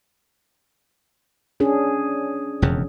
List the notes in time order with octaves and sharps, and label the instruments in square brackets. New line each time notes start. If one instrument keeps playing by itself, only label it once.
[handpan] C#4 D4 G#4
[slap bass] E1 F2 C#3